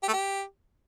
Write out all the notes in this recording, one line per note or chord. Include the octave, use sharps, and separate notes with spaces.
G4
A3
G4